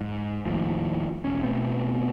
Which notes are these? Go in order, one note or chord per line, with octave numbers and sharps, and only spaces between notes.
G#2
D#2 A2 F3
E1 C#4
B2 A3 B3 C4